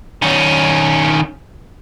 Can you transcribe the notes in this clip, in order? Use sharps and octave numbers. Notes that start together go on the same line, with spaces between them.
D#3 C#4